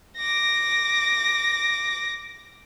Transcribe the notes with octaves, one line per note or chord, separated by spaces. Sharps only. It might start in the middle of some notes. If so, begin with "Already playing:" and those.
D6 A#6